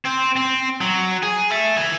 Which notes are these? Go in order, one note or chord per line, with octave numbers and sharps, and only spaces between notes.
C4
C4
F#3
G#4
E5 A5
E5 G#5